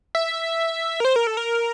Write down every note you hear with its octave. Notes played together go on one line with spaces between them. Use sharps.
E5
A#4
C5
A#4
A4
A#4